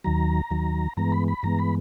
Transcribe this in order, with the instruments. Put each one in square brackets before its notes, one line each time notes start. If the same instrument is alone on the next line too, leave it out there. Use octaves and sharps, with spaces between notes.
[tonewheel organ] D#2 D#3 F#3 A#5
D#2 D#3 F#3
G2 E3 G#3 B3 A#5
B5
B5
G2 E3 G#3 B3 A#5
B5